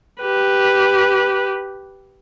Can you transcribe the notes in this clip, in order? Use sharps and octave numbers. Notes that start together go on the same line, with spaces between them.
G4 B4